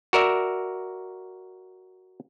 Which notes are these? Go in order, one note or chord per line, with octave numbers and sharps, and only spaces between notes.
F#4 A#4 D5 E5